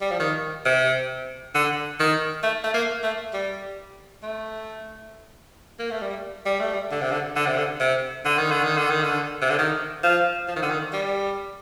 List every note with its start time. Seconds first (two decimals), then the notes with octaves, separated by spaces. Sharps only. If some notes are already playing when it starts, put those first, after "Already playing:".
0.01 G3
0.11 F3
0.20 D#3
0.66 C3
1.55 D3
2.00 D#3
2.43 A3
2.64 A3
2.74 A#3
3.04 A3
3.34 G3
4.23 A3
5.79 A#3
5.91 A3
6.02 G3
6.46 G3
6.60 A3
6.74 G3
6.91 D3
7.01 C3
7.12 D3
7.36 D3
7.47 C3
7.58 D3
7.80 C3
8.25 D3
8.39 D#3
8.51 D3
8.64 D#3
8.77 D3
8.90 D#3
9.03 D3
9.42 C3
9.50 D3
9.59 D#3
10.03 F3
10.48 F3
10.56 D#3
10.62 D3
10.70 D#3
10.93 G3